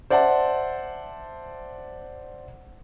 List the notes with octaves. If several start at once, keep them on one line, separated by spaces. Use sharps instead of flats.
C5 D5 E5 F#5 A5